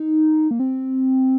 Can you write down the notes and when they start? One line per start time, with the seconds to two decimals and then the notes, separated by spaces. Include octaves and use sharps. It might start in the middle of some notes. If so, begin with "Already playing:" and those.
Already playing: D#4
0.51 A#3
0.60 C4